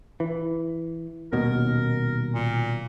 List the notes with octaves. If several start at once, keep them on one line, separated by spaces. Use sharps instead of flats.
E3
D#1 D#2 B2 A#4
A#2